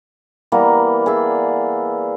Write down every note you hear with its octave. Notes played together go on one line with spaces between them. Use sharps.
E3 G3 A#3 B3
G#4 D5 E5